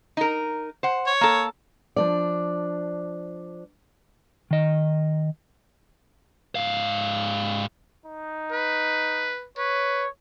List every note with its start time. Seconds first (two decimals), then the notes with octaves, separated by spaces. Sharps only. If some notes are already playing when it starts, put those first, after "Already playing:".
0.17 D#4 A#4
0.83 C5 F#5
1.07 C#5
1.21 A#3 A4
1.96 F3 D4 D5
4.51 D#3 D#5
6.55 G#2 F5
8.06 D#4
8.51 B4
9.58 B4 C#5